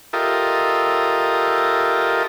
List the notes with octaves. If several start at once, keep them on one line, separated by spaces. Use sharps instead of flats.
F4 G4 A4 A#4 D#5 E5